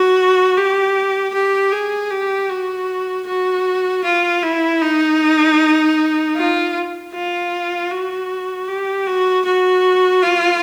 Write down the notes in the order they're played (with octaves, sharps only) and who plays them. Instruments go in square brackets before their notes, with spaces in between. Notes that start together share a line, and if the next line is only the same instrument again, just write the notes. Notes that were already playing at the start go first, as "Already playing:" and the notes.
Already playing: [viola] F#4
G4
G4
G#4
G4
F#4
F#4
F4
E4
D#4
F4
F4
F#4
G4
F#4
F#4
F4